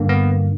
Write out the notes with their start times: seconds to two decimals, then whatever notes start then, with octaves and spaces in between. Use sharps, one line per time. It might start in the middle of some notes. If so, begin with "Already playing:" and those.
Already playing: G2 D3 A#3
0.09 B3